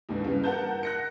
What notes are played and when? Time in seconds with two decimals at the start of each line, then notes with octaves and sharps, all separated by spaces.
0.09 D#2 G#2 D3 E3
0.25 G2 C#3 E3
0.44 A#4 F#5 A5 G6
0.83 F#6 A#6 C#7